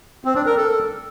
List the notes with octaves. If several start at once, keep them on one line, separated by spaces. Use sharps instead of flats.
C4
D4
A#4
A4